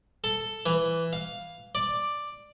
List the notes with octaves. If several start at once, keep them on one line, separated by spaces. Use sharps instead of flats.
A4
E3
F5
D5